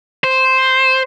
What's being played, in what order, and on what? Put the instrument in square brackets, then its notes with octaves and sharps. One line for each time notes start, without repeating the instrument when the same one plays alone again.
[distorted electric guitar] C5